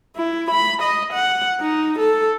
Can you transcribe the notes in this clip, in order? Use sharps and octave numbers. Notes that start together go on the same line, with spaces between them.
E4
B5
D#5
F#5
D#4
A4